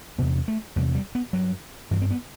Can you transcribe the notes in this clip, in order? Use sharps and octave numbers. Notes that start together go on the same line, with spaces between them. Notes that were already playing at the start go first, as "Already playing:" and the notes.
E2 C3 B3
A3
E2 C3 G3
G3
B3
G2 F#3
G2 E3
C4
B3